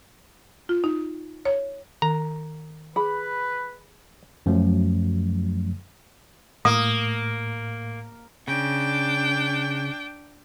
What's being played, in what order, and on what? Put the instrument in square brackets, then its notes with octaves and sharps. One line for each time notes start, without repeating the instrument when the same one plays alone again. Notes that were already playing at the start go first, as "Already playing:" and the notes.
[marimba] F4
D#4
C#5
[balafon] D#3 [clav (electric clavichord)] A#5
[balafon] G#4 [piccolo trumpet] B4 [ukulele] B5
[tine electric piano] F#2 F3 F#3 A3
[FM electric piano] A2 [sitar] A#3 [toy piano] D#6
[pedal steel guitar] C#3 [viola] D4 G5